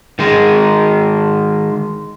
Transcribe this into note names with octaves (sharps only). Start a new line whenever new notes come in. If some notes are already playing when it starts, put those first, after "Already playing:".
D#3 G#3